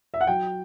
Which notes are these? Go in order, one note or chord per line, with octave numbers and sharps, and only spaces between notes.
E5
F#5
F#3 G5